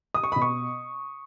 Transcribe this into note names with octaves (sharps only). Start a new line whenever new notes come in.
D#6
C#6
B5
B2
C#6